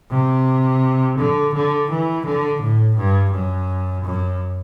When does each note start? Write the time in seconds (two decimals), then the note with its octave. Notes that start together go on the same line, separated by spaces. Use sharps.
0.11 C3
1.18 D3
1.54 D3
1.90 E3
2.25 D3
2.61 A2
2.97 G2
3.33 F#2
4.04 F#2